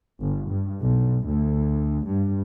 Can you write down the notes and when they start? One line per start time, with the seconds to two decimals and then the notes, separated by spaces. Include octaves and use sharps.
0.21 G1
0.49 G2
0.80 B1
1.25 D2
2.06 G2